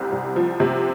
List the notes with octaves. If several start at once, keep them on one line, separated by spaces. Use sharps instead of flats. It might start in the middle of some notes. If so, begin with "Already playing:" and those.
Already playing: C2 C3
C2
F3
C3